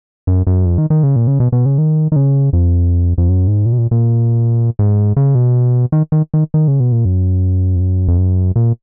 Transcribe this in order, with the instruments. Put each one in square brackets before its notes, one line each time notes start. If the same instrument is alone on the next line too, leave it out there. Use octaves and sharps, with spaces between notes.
[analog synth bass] F#2
F#2
F2
D#3
D#3
C#3
A#2
C#3
B2
B2
C#3
D#3
D#3
C#3
F2
F2
F#2
G#2
A#2
B2
A#2
A#2
G#2
C#3
B2
D#3
D#3
D#3
D#3
C#3
B2
A#2
F#2
F2
F#2
F2
F#2
A#2